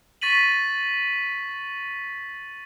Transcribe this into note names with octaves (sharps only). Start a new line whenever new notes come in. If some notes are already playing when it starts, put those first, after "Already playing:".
C#6 A6 B6 D#7 F#7